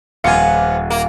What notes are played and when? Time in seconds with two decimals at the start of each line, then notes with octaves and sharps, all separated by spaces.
0.24 D#1 F2 B3 F4 F5 F#5 G#5 C#7
0.90 A#3